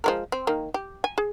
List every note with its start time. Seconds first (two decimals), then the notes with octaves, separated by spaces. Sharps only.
0.04 F3 G#3 A#4
0.32 C4
0.47 D#3 A#3
0.74 G4
1.04 G#5
1.18 G#4